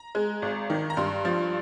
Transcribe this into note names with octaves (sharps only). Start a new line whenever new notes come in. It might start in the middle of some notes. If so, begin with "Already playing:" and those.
Already playing: A#5
G#3
G#1
D#3
A#5
G2 C6
F3